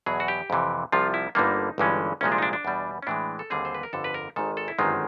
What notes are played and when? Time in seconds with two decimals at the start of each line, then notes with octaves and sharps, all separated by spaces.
0.06 E2 B2 F#3 G#4
0.20 F#4
0.28 G4
0.50 F2 C3 E3
0.92 C2 C3 F3 F4
1.14 E4
1.35 G1 G2 D3 G3 A#3 D#4
1.78 G1 G2 E3 G#3 C#4
2.21 C2 A#2 F3 G#3 C#4
2.32 D4
2.38 D#4
2.42 D4
2.53 D4
2.65 E2 B2 G3
3.02 C#4
3.07 A2 E3 G#3 D4
3.39 A4
3.50 D#2 D3 G3 C4 G#4
3.65 C5
3.75 B4
3.83 A#4
3.93 G1 F2 D3 A4
4.04 B4
4.14 A#4
4.36 G#1 G#2 D#3 A4
4.57 A4
4.68 E4
4.78 G1 F#2 D#3 G#3 C4 F4